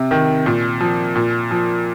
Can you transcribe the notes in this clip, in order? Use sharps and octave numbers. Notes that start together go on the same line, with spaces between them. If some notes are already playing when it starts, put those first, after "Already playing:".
Already playing: C3
D#3
A#2
F3
A#2
F3